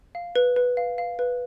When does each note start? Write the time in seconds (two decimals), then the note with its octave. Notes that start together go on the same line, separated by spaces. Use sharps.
0.15 F5
0.36 B4
0.56 B4
0.77 F5
0.98 F5
1.19 B4